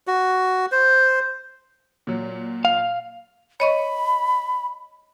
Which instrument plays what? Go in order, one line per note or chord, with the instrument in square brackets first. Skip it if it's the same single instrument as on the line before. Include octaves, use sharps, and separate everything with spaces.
[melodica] F#4
C5
[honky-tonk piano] A#2 F#3
[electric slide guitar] F5
[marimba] C#5 D#5 C#6 [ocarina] B5